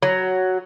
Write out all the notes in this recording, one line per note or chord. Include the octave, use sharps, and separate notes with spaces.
F#3